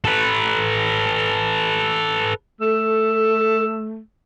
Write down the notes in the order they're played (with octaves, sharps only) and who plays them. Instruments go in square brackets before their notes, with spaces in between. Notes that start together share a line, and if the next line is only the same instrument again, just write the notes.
[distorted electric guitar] A4 B4
[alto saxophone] A3 [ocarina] A4 [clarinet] E6